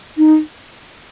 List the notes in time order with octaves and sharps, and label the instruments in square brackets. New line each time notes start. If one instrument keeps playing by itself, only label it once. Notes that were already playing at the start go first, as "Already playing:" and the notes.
[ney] D#4